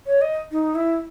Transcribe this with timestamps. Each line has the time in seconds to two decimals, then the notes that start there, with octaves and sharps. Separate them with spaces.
0.07 C#5
0.21 D#5
0.52 D#4
0.75 E4